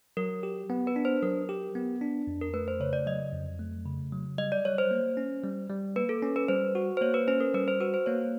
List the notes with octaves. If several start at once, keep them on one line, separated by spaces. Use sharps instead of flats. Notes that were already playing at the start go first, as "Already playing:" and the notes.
F#3 A#4
G4
B3
B4
D4
C5
F#3 A#4
G4
B3
D4
F2
A#4
A3 B4
C5
C#3 C#5
D5
F#3 D#5
F2
A3
C#3
F#3
G3 D#5
D5
G3 C#5
C5
A#3
C#4
G3
G3
A#3 B4
A4
C#4
B4
G3 C5
F#4
C5
A#3 C#5
B4
C#4 C5
A#4
G3 B4
C5
F#4 B4
C5
A#3 C#5